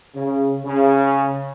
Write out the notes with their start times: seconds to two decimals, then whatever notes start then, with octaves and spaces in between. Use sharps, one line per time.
0.15 C#3
0.65 C#3